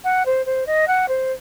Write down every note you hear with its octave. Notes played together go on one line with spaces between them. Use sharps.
F#5
C5
C5
D#5
F#5
C5